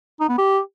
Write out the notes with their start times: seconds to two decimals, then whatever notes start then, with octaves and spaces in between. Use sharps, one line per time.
0.20 D#4
0.29 B3
0.38 G4